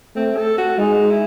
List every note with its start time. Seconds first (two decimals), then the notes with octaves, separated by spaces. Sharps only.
0.15 A3 C4
0.37 A4
0.58 F#4
0.78 G#3 D#4
1.10 E4